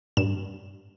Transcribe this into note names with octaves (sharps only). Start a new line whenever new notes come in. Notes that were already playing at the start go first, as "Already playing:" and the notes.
G2 E7